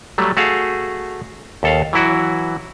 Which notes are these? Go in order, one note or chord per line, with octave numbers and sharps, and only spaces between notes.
F#3 G3 A3
A3 F#4 G#4 F5
D#2 A4 F5
E3 F#3 E4 F#4